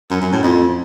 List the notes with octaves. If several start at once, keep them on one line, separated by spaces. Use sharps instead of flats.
F#2
F#2
A2
F2